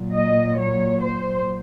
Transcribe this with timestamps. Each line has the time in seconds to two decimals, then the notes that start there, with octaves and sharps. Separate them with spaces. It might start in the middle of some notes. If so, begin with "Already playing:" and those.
Already playing: A#2 F#3
0.14 D#5
0.59 C#5
1.02 C5